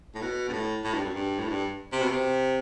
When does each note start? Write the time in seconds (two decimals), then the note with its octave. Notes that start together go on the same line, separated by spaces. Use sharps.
0.15 A2
0.22 B2
0.49 G2
0.53 A2
0.85 A2
0.94 G2
1.05 F#2
1.14 G2
1.39 A2
1.49 G2
1.92 C3
2.02 B2
2.10 C3